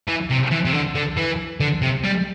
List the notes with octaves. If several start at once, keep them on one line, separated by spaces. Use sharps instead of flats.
E3
C3
E3
C3
D3
D3
E3
D3
C3
G3